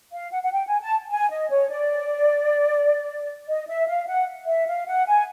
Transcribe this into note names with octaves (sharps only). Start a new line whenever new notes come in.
F5
F#5
F#5
G5
G#5
A5
G#5
D#5
C#5
D5
D#5
E5
F5
F#5
E5
F5
F#5
G#5